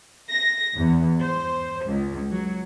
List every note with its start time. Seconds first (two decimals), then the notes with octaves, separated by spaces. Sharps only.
0.29 A#6
0.74 E2
1.22 C5
1.86 C#2
2.31 F#3